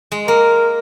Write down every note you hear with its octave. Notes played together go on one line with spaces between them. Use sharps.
G#3
A#3 A#4